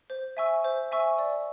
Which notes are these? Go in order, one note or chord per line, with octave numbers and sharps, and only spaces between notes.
C5
E5 G#5 C#6 E6
C5
E5 G#5 C#6 E6
D5